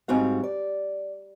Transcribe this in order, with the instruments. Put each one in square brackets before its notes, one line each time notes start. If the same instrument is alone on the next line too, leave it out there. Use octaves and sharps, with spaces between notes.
[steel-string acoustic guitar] G#2 G3 C4 F#4 F5
D5